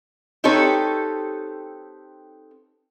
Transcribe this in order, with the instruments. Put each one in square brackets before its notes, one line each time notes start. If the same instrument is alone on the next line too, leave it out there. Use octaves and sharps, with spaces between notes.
[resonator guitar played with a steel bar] C4 D#4 G4 A4 B4 C#5